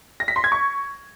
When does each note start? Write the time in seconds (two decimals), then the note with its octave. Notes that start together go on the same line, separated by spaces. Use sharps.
0.20 A#6
0.28 B6
0.36 C6
0.44 G#6
0.52 C#6